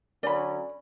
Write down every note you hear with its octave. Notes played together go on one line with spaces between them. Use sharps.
D3 F#3 C#4 D5 B5